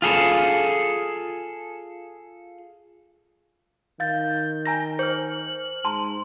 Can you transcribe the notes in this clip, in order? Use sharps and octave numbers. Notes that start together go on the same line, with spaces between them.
F4 G#4 A4
D#3 F5 G6 A6
G5 G#5 A#5 A#6
C5 F6 G6 F#7
G#2 A5 A#5 C6